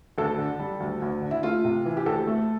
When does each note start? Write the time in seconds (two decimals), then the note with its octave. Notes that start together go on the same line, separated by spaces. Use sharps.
0.18 D2 A4
0.38 D3
0.59 G3
0.80 D2
1.02 D2
1.22 D3
1.31 E4
1.43 A3 F4
1.65 C3
1.85 E3
1.97 G4
2.06 D2 A4
2.27 A3